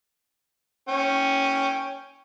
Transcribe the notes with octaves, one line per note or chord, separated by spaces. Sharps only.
C#4 G5